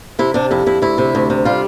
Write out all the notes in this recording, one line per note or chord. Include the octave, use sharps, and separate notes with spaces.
C3 E4
C3 D4
F2 E4
F2 E4
D2 E4
C3
D2
C3
G3 F4